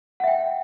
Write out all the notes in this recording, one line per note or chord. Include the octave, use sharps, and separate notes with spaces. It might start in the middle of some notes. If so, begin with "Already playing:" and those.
E5 F#5 G5